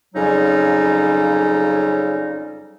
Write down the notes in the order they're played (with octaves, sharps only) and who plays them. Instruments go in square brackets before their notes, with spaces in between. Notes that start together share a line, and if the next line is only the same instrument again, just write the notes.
[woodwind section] F2 C#3 F#3 G3 C#4 D#4